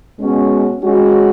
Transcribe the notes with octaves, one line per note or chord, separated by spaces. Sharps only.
B2 G#3 C#4 F#4
G#3 C#4 F#4